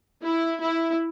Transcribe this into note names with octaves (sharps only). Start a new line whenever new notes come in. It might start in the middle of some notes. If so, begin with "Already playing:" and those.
E4
E4